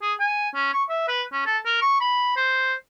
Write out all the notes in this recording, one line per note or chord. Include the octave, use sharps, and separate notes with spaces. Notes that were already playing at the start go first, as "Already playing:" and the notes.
G#4
G#5
C#4
C#6
E5
B4
C#4
A4
A#4
C#6
B5
C5